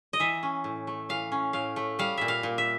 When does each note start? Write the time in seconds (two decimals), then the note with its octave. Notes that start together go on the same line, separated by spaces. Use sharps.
0.13 D#5
0.20 E3 E5
0.43 C#4
0.64 A2
0.87 A3
1.09 E3 F5
1.32 C#4
1.53 A2 F5
1.76 A3
1.99 G3 F5
2.17 A#2 E5
2.28 F5
2.43 A#2
2.58 E5